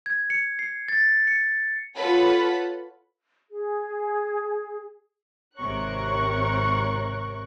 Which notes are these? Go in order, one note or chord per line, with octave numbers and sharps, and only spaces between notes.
G#6
C#7
C7
A6
C#7
F4 A4 B4 C#5 F#5 B5
G#4
G#1 C3 A#4 C#5 C#6 F#6